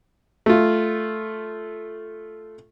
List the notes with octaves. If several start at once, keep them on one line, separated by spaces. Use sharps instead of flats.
A3 F4